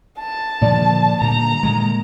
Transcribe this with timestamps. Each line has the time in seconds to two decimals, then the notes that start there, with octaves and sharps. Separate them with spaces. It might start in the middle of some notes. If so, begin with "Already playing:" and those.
0.19 A5
0.61 A#2 D3 D#3 F3 D5
1.21 A#2 D3 G3 A#5
1.63 A#2 D#3 G#3